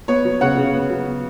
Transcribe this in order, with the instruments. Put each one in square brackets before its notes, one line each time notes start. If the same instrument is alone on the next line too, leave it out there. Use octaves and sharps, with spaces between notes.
[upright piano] B3 C#5
F#3
C#3 C#5 F#5
C#3
B3
F#3